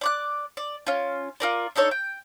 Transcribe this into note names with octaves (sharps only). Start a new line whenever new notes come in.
D5 D6 F#6
D5
C#4 F4
F4 A#4 D5
D4 D#4 A4 C#5
G5